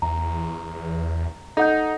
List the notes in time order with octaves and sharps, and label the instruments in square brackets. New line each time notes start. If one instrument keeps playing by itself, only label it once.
[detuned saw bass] E2 [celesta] A#5
[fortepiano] D#4 [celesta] A4 F#5 G6